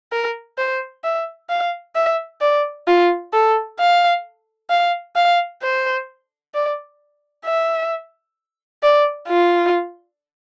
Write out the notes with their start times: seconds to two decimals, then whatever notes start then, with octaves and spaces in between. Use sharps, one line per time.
0.12 A#4
0.58 C5
1.04 E5
1.50 F5
1.95 E5
2.41 D5
2.87 F4
3.33 A4
3.79 F5
4.70 F5
5.16 F5
5.62 C5
6.54 D5
7.45 E5
8.83 D5
9.28 F4